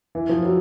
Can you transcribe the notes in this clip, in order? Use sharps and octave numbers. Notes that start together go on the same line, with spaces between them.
E3
F3
F#3